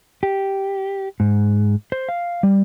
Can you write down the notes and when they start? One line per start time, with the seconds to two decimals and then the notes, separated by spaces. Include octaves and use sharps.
0.23 G4
1.20 G#2
1.92 C5
2.09 F5
2.43 G3